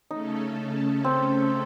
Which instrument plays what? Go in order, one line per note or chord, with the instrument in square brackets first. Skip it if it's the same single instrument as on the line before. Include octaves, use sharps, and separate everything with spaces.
[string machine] C#3 A3 C#4 A4 [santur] D#4
[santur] C4